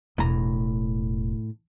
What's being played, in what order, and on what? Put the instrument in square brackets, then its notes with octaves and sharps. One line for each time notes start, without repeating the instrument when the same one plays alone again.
[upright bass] E1 [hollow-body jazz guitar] A2 A#5